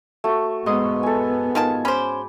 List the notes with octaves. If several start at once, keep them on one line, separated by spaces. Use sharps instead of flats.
A3 F#4
G#2 B3 D#5 D#6
A4 G#5
D#3 F4 G#5 A5
C#4 C5 B5 D6